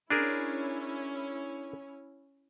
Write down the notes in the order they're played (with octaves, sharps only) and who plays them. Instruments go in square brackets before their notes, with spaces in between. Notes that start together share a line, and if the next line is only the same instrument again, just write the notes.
[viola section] C#4 E4 [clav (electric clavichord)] D4 G#4 A#4